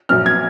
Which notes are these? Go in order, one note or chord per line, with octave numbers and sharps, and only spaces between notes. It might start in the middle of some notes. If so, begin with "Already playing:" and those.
A#1 A#2 F#3 F6
G#6